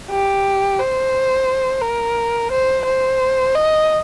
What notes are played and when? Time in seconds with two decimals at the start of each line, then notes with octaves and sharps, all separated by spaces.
0.11 G4
0.79 C5
1.81 A#4
2.51 C5
2.85 C5
3.55 D#5